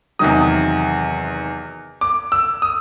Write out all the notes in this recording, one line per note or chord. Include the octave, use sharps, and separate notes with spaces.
E2 C3 D#3 F#3 D#6
D6
E6
D#6